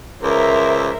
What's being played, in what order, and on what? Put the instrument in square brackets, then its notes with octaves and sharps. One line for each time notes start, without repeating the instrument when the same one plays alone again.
[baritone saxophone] C#2 [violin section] A#4 C5 E5